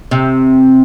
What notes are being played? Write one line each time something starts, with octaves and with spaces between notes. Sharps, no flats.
C3